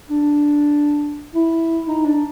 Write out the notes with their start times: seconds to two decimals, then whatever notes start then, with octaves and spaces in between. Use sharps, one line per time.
0.09 D4
1.34 E4
1.87 D#4
2.05 D4